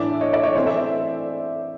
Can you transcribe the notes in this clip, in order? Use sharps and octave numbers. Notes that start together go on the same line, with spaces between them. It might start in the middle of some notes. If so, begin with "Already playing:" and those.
Already playing: A2 E3 A3 D4 D5 E5
C#5 D#5
D5 E5
C#5 D#5
E3 A3 C4 C5
D5 E5